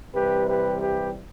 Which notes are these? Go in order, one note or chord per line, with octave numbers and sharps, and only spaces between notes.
C3 E3 G3 G4 B4
G4 B4
G4 B4